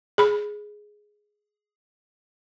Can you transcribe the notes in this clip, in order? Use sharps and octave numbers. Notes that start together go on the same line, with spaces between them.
G#4 B5